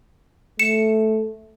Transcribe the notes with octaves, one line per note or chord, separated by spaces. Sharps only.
A3 C#7 E7